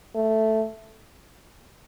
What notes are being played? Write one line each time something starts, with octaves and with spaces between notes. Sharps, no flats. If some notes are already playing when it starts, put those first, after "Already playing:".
A3